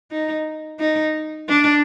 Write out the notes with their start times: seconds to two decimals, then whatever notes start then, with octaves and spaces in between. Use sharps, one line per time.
0.11 D#4
0.79 D#4
1.49 D4